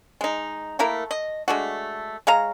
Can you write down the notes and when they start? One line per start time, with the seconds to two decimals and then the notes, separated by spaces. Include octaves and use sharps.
0.21 G#3 D#4
0.79 A3 A#3 E4 A#4
1.11 D#5
1.48 G#3 A3 D4 F#4
2.27 G#3 C#5 F5 A#5